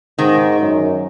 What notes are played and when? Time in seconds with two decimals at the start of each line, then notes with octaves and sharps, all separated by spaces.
0.19 G#2 D#3
0.60 F#2